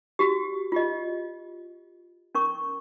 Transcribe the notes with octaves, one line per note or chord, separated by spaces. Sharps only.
F#4 G4
F4 G4 D#5
C#4 A#4 C#6